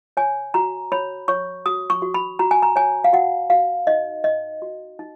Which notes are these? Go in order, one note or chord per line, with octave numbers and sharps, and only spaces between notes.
C#5 G#5
F#4 A#5
C#5 B5
C#5 C#6
F#4 D#6
C#6
F#4
B5
F#4 A#5
G#5
A#5
C#5 G#5
F5
F#4 F#5
F#4 F5
D#4 D#5
D#4 D#5
F#4
D#4